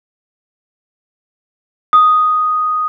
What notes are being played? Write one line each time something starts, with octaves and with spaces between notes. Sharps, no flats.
D#6